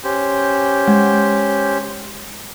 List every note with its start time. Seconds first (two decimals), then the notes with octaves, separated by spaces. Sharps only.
0.04 C#4 G4 C5
0.88 G#3